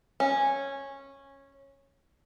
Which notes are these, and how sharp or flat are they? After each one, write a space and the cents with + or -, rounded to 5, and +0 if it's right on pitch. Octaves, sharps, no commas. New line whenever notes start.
C#4 -10